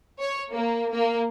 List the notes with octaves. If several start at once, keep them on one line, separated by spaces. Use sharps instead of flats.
C#5
A#3
A#3